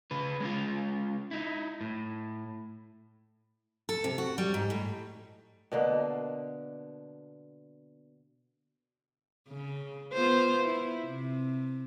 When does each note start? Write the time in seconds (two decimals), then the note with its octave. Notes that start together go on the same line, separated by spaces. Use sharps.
0.11 C#3 B4
0.40 G#3 C#4 F4
1.31 D#4 E4
1.81 A2
3.89 A4
4.04 C3
4.18 F#4
4.38 G3
4.54 G#2
4.70 A2
5.72 B2 D3 A#3
9.49 C#3
10.14 B3 F4 C5
10.64 E4
11.04 C3